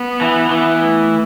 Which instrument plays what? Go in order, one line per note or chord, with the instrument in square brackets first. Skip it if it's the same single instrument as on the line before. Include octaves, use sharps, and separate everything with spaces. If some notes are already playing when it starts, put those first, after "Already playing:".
Already playing: [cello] B3
[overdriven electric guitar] E3
E3
[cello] A3